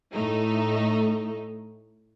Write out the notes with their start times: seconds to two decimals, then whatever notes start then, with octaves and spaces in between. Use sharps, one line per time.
0.12 A2 A3 D#4